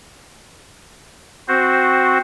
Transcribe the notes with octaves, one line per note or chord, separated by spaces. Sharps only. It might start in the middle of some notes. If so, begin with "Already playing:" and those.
C4 F#4 C5